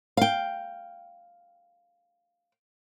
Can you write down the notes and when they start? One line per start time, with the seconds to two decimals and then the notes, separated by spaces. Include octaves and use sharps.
0.17 F5 G5